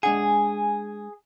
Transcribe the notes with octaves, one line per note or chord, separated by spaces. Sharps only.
G#3 D4 G#4 F#5 G#5